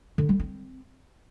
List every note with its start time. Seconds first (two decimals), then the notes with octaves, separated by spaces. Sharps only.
0.18 D3
0.29 G3
0.40 C4